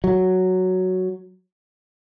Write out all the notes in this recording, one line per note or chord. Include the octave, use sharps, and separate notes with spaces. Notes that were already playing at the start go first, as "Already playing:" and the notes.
F#3